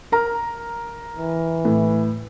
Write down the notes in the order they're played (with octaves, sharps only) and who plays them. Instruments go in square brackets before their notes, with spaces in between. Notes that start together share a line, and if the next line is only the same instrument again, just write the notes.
[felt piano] A#4 A#5
[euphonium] E3
[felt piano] A2